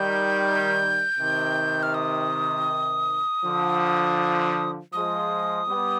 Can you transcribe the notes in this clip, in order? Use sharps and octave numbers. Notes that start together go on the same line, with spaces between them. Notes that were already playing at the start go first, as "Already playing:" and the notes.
Already playing: D#3 G3 G6
C3 D#3
F6
D#6
D3 F3
F3 G#3 D#6
G3 B3